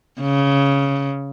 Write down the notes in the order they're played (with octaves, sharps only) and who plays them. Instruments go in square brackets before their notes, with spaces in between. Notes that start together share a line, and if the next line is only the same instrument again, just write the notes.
[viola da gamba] C#3